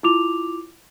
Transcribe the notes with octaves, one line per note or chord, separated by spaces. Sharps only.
E4 F4 D6 F7